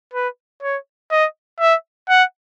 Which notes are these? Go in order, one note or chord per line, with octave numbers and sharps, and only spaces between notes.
B4
C#5
D#5
E5
F#5